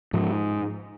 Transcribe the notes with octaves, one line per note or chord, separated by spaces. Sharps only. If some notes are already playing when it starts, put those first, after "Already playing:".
G#2 F3